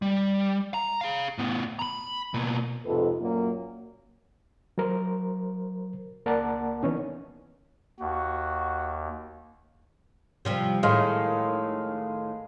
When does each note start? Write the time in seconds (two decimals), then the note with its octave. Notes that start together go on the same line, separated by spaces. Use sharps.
0.02 G3
0.74 A#5
1.01 G#4 F5
1.38 A2 B3
1.79 A#5 B5
2.34 B2 A#3
2.86 F2 G#2 C3 F4 A4 B4
3.20 F#2 A#2 F#3 A#3
4.78 F#3 A#4 C5
6.26 C#2 A#3 A#4 D5 F#5 A5
6.83 E3 B3 C#4 D#4
8.00 D#2 F#4
10.45 C3 F3 G3
10.83 A2 D#3 G#3 F5